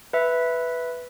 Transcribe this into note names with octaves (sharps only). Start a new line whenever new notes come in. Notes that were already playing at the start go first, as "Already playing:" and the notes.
B4 E5